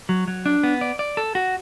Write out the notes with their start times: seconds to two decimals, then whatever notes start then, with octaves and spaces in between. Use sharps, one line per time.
0.09 F#3
0.28 F#3
0.46 D4
0.63 B3
0.81 D5
0.99 D5
1.17 A4
1.35 F#4